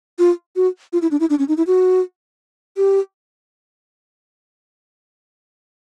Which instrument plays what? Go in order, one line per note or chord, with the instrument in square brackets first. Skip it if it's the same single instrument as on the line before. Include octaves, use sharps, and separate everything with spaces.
[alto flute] F4
F#4
F4
E4
D4
E4
D4
C#4
D#4
E4
F#4
G4